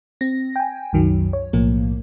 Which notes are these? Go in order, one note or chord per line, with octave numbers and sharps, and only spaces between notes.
C4 A#6
G5 G#5
C2 F#2 D#3 F#3
C#5
B1 A2 F3 A#3